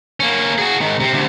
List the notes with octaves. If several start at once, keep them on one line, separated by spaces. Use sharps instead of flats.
A#3 C#4
F#4 G#4
G#2 D#3
C3 C4
D2 C3